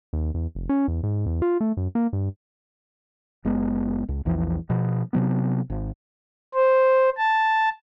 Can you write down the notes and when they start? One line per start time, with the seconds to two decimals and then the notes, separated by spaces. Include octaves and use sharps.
0.13 D#2
0.34 E2
0.55 F1
0.69 C#4
0.88 E2
1.03 G#2
1.26 E2
1.42 F4
1.61 A3
1.77 F#2
1.95 A#3
2.13 G2
3.45 F#1 G#3 B3
4.09 C#2
4.25 A#1 E2 E3 F3
4.70 B2 F3
5.13 C3 F#3 B3
5.70 G#1
6.54 C5
7.18 A5